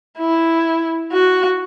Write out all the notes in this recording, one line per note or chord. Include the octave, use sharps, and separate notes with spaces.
E4
F#4